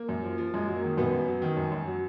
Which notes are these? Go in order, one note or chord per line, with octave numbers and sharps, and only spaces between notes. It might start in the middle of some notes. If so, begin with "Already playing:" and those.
Already playing: A#3
F#2
F3
F3
F#2 G#3
F#3
A#3
D#3
F#2 B2 B3
F#2
F#3
D#3
F#2
F#2
F#3